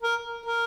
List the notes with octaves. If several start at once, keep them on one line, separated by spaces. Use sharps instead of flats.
A#4
A#4